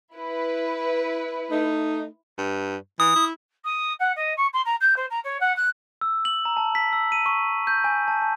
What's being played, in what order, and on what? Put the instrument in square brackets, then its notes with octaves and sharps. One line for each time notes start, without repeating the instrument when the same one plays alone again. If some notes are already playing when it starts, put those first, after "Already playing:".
[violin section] E4 B4
[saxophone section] A3 D#4
[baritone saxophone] G2
[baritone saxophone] E3 [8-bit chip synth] D#6
[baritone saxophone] E4
[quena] D#6
F#5
D#5
C#6
C6
A#5
G6
C5
A#5
C#5
F#5
F#6
[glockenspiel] E6
F#7
A#5
A5
B6
E6
D#7
C#6
G6
G#5
A5
A5